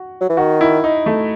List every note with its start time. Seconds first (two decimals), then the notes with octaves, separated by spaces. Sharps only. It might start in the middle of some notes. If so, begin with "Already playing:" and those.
Already playing: F#4
0.21 F#3
0.29 E3
0.37 D#3 F#4
0.61 E4
0.84 D#4
1.06 A3